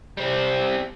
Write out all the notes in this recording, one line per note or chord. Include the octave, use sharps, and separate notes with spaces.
G3 C4